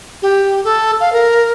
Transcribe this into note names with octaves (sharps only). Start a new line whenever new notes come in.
G4
A4
F5
A#4